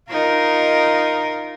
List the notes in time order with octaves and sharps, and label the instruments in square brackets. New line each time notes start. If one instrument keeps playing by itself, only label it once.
[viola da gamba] D#4 F4 A#4